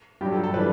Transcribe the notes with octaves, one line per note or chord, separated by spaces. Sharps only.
G2 F#3 G4
A4
A4
E3 G3 B4